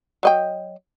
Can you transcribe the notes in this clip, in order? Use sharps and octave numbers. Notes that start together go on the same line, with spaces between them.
F#3 D#5 G5